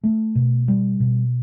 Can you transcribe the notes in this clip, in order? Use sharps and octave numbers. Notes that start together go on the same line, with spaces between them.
A3
B2
G3
B2